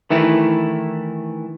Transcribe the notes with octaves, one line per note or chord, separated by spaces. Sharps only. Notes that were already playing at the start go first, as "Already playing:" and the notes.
D#3 E3 A3 E4